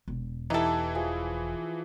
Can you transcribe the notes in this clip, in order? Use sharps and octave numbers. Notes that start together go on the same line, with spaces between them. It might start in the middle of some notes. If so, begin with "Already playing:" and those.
E1
E3 D#4 E4 G4 A4 E5
F3 G#4 G#5